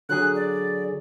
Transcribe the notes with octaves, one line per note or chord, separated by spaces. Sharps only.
D3 F#3 G#4 F#6
D5